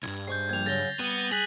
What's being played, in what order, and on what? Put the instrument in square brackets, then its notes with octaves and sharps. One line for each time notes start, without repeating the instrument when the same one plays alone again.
[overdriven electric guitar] B1 G2 [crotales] G#6
[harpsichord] G#2 C#6 [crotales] G6 C7
[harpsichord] A#1 G3 [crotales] G#6 F7
[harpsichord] C#3 F#3 [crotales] A6 A#6 G7
[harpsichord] G3 [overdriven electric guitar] B3 [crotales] D#7
[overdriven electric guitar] G#4 [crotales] F#6 B6 F#7